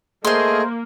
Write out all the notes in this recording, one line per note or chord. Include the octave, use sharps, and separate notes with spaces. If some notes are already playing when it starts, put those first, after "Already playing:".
A3 A#3 G#4 A4 C5 D#5 C6